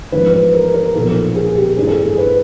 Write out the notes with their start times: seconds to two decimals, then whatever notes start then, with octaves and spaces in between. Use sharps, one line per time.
0.12 A1 G#2 F3 B4
0.33 B4
0.54 A#4
0.74 A#4
0.95 B1 A#2 F3 A#3 A4
1.36 G#4
1.57 G4
1.77 A1 G2 E3 G#4
1.87 A4
2.00 G#4
2.18 B4